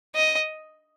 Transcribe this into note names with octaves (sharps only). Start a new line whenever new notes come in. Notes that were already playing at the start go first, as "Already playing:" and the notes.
D#5